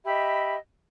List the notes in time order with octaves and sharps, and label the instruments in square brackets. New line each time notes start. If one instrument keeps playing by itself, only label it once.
[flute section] G4 D#5 E5 B5